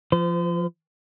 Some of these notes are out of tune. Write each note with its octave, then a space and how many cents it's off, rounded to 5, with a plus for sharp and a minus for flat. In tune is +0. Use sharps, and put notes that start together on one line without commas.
F3 -15 C5 -40